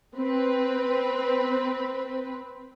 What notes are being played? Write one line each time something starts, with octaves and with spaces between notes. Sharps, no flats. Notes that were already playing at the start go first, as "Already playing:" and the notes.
C4 B4